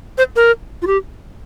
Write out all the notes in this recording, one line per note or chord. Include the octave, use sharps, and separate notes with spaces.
C5
A#4
F4
G4